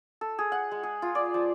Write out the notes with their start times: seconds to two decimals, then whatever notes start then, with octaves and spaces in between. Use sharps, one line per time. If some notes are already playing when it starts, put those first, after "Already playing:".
0.21 A4
0.39 G#4
0.52 F#5
0.71 G#3
0.83 G#4
1.02 F4
1.15 D5
1.34 F3